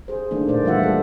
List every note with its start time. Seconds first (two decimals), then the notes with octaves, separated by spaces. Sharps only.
0.08 G#4 C5
0.31 D#3 A3 A#3 D4
0.48 A#2 A3 C5 D5
0.64 E3 G3 F4 E5 F#5
0.83 G#3 A4